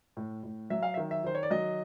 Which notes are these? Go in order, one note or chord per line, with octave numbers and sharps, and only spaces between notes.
A2
A2
F#3 E5
F5
E5
D#3
E5
D#3 C5
C#5
D5
F#3 D#5